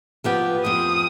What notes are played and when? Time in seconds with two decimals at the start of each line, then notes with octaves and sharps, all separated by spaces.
0.24 F3 B3 G4
0.65 F2 C4 D#6